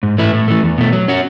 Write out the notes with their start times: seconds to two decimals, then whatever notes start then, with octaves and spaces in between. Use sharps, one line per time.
0.03 G#2
0.18 E3 A3 E4
0.33 A2
0.48 E3 A3
0.63 E2
0.78 B2 A3
0.93 F#3
1.08 C#4 F#4